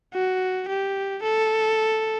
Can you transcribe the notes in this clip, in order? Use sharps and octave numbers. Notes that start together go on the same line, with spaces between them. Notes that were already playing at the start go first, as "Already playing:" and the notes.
F#4
G4
A4